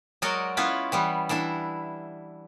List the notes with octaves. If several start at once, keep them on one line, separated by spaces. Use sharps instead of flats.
F#3 G#3 F#4 A#4 D5 D#5
B3 C#4 E4 F4 B4
E3 G3 B3
E3 D4 E4 E5